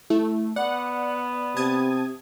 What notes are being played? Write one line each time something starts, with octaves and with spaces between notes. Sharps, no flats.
A3 E4
B3 D5 F#5
C3 A5 D#6 G#6